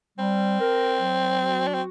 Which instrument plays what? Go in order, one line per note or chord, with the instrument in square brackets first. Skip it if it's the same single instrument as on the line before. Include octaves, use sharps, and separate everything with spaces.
[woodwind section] G3 [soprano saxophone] C4
[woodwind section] A#4
F#3
F#4
[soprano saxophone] D4
C4